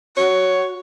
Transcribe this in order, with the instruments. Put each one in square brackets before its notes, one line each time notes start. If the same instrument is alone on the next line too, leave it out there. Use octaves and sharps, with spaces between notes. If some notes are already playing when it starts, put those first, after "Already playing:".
[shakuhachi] F#4 [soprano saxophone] C#5